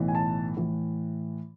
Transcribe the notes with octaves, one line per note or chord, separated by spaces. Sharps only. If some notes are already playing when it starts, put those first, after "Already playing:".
Already playing: B1 A2 E3
G#5
A5
A2 E3